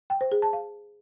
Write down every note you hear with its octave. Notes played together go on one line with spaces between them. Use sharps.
G5
C5
G#4
A5
F5